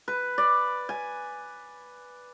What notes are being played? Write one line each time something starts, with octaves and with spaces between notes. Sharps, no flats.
B4
D5
G#5